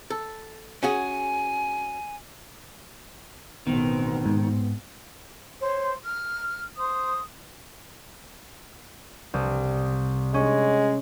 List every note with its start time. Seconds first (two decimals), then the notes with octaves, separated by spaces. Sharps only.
0.10 A4
0.83 C#4 F#4 G#4 G#5
3.67 A1 B2 D#3 B3 C4
4.26 G#2
5.61 C5 C#5
6.04 F6
6.76 C5 D#6
9.34 C2
10.34 G#3 C#4